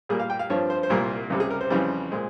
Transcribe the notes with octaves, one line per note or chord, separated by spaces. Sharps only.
A#2 G3 A#3 G#4
F5
G5
F5
G2 F3 C4 C#5
C5
C5
C2 A#2 G3 A#3 A#4
C#2 C3 G3
G#4
A#4
C5
F2 C#3 E3 G3
A#2 G#3 C4